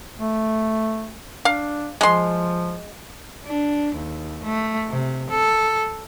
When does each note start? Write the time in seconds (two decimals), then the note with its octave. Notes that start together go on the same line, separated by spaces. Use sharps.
0.19 A3
1.45 D4 F5
2.01 F3 G#3 C6
3.46 D4
3.95 D#2
4.45 A3
4.90 C3
5.30 A4